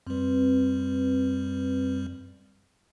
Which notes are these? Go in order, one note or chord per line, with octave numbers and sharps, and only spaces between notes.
F#2 G3 C4 B4